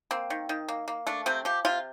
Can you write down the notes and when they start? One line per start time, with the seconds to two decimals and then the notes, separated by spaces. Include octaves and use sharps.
0.11 A#3 C4
0.30 D#3
0.49 D#3
0.68 A#3
0.88 A#3
1.07 A3 D4
1.26 C3 C4
1.45 F3 G4
1.65 C3 F4